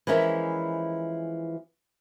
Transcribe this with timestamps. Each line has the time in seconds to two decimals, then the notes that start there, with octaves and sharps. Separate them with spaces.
0.07 E3 F3 G#3 C#4 E4 A#4